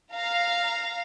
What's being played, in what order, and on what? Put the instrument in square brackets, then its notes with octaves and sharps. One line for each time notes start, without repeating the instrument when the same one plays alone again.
[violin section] F5 A#5